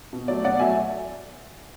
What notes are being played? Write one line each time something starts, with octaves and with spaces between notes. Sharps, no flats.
B2
F#3 A3 D5
B2 D5 F#5
F#3 A3 E5 G#5